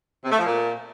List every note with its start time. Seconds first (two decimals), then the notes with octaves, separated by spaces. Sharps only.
0.25 C3
0.32 A3
0.39 F3
0.46 A#2